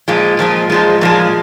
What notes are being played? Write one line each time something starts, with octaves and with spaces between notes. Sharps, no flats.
A#2 F3 G#3
A#2 F3 G#3
A#2 F3 G#3
A#2 F3 G#3